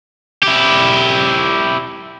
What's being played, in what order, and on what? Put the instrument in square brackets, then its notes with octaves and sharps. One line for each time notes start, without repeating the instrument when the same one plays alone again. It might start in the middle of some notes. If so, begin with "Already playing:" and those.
[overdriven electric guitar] E4 G4